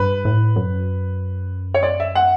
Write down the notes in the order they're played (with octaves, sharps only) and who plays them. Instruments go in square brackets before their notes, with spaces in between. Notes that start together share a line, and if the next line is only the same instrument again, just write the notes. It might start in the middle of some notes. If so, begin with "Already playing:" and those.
Already playing: [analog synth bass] G2 [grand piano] B4
[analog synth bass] A2
F#2
[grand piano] C#5
D5
E5
F#5